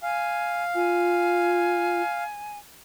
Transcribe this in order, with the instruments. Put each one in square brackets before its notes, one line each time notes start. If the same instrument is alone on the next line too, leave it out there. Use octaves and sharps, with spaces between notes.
[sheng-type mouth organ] F5 [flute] G#5
[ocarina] F4 [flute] G#5